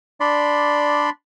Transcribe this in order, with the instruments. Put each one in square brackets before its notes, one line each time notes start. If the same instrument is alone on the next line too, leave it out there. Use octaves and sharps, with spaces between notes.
[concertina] D4 D5 B5 C6